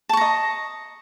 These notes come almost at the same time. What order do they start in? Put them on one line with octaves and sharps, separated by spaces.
A5 C#6 A#5 D#5